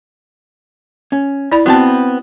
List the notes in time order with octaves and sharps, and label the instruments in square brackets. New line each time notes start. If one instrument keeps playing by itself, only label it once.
[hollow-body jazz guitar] C#4
[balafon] E4 D5 B5
[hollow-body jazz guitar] B3 C4 A5 [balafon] F#4